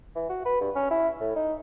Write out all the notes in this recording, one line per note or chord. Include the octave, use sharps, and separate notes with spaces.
E3
F#4
B4
G2
C#4
E4
A2
D#4